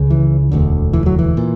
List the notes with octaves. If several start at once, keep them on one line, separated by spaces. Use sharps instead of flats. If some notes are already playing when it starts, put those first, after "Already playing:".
Already playing: C#2 C#3
E3
E1 D2 D3
E3
F#3
E3
A#2